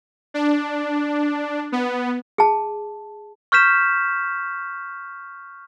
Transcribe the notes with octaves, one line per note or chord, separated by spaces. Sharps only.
D4
B3
G#4 A5
C#6 F6 G6 B6 E7